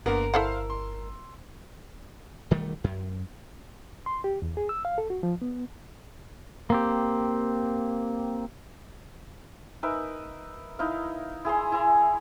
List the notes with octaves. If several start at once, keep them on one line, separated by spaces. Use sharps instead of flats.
G1 D3 A#3 B3 A#4
E4 A4 C5 F5 F#5 E6
C6
E1 D#3 G3 A3
F#2
C6
G4
E2
G#4
E6
F5
A4
F#4
F3
B3
A#3 C4 G4
D#4 A#4 B4 E5
D#4 E4 F5
E4 G#4 A#5 C6
E4 G#5 A#5